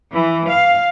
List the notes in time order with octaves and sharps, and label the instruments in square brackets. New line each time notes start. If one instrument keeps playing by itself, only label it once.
[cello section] E3
F5